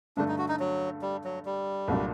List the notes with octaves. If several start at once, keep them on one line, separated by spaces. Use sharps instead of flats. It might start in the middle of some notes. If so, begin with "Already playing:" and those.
G2 D3 A3 D4
D#4
F#4
D#4
F#3
G3
F#3
G3
C2 A#2 F#3 A3 D4